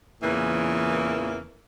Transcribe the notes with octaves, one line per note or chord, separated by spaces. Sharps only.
E2 A#2 C#3 E3 A#3